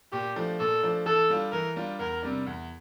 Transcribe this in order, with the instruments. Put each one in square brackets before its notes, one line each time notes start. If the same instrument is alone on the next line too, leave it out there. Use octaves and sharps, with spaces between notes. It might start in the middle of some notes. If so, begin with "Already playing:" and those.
[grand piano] A#2 [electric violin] G4
[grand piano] F3 A3 D4
[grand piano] A#2 [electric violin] A4
[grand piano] F3 A3 D4
[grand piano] E3 [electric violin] A4
[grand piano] G3 D4 F4
[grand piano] E3 [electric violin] A#4
[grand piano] G3 D4 F4
[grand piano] E2 [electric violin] A#4
[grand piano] C3 G3 D4
E2